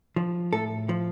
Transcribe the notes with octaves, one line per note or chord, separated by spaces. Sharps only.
F3
A2 A4
F3